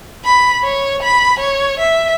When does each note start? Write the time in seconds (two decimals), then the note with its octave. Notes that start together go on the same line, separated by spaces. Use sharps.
0.25 B5
0.64 C#5
1.03 B5
1.40 C#5
1.80 E5